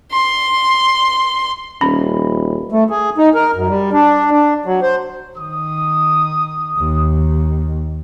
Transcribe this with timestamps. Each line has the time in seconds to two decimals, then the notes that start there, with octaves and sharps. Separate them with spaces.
0.12 C6
1.81 D#1 C#4 B5
2.71 A3
2.90 G#4
3.18 D#4
3.35 A#4
3.55 F#2
3.68 G3
3.93 D4
4.31 D4
4.66 F#3
4.82 C5
5.38 D#3 D#6
6.78 D#2 D#3